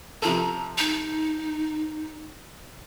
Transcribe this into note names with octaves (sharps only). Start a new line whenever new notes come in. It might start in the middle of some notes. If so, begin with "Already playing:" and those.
C3 F3 A4 A#5
D#4